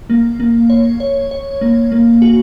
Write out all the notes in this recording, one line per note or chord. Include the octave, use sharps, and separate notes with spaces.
A#3
A#3
C#5
C#5
C#5
A#3
A#3
F#4